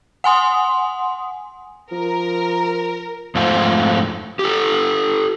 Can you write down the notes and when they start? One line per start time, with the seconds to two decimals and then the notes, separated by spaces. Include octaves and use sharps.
0.24 F#5 G#5 C6 D#6
1.92 F3 A#4
3.35 F2 G#2 A3 F4 C5
4.39 G4 A4